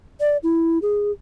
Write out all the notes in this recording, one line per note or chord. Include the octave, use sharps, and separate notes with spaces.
D5
E4
G#4